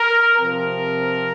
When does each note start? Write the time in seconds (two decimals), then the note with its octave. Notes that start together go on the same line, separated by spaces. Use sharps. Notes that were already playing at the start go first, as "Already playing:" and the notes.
Already playing: A#4
0.38 C3 F3 C4 A#4